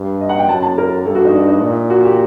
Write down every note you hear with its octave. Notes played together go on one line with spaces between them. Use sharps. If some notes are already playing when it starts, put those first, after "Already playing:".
Already playing: G2
D#5
F#5
G5
F#2 A5
A5
A#4
G2 A4
F#4
D#4
D4
D#4
A#2 D#4
F#4
G4